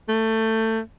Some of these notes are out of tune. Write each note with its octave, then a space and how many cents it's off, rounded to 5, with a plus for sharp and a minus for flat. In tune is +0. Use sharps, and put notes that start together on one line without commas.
A3 +20